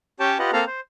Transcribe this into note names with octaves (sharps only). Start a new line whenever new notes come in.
C#4 G4 C#5 G5 A5
F4 G4 B4 D#5 F#5
A#3 C4 A4 F5 A#5
C5